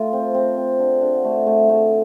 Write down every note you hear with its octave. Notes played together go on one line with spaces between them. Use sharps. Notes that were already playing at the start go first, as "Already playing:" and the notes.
Already playing: A3 F4
C4
C4
C4
D3
D3
A3
A3
A3